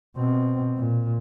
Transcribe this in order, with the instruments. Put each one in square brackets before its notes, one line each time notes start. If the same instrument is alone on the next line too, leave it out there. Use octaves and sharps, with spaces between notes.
[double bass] B2 C4
A#2